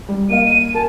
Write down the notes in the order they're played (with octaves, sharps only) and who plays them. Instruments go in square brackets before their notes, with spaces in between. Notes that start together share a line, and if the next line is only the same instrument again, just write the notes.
[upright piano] G3
[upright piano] A#3 D#5 F5 [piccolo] D#7
[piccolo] D#7
[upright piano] A#4 G#5 [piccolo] A5